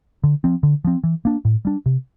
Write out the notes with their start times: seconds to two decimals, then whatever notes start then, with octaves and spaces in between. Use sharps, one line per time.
0.24 D3
0.44 F3 C4
0.63 D3
0.84 F3 C4
1.04 E3
1.25 A#3 D4
1.45 A2
1.65 G3 D4
1.86 C3